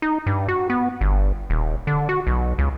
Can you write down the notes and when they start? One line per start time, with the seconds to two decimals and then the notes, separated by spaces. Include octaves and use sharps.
0.02 D#4
0.26 G2
0.48 F#4
0.70 B3
1.01 G1
1.50 D#1
1.87 D3
2.09 F#4
2.27 B1
2.58 C#2